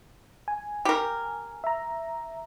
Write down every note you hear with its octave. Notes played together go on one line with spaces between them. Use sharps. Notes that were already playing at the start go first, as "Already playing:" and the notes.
G#5
G4 A#4
E5 A#5